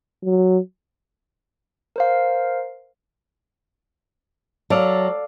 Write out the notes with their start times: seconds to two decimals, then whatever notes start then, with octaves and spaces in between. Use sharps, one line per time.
0.24 F#3
1.96 A#4 C5 F5
4.70 F#3 A4 D5 F5